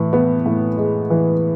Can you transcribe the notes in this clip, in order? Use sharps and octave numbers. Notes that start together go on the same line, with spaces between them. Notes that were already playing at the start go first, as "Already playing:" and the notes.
Already playing: A2 E3
B3
A2
G#3
E3